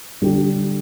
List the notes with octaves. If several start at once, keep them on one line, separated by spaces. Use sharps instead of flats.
D3 G3 D4 G4